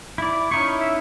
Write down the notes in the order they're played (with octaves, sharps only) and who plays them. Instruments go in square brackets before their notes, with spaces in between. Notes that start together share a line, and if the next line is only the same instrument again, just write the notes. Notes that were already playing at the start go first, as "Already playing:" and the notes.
[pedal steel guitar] E4 D5
[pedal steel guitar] C#4 D#4 E4 [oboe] C#6
[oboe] E5